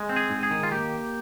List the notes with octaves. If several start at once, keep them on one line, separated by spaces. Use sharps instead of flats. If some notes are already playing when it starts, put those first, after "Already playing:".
Already playing: G#3
C4
G#4
G#2
G#4
D#3
F4
A#3 G4